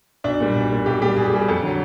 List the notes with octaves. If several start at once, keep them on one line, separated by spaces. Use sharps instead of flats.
B1 D4
A#2 G3
B1
A#2 G3
B1 G4
A#2 G3 G4
B1 G#4
G4
A#2 G3 G#4
F2 A4
D3 F#3